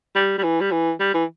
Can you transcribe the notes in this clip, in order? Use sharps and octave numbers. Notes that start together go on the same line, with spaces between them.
G3
G3
E3
G3
E3
G3
E3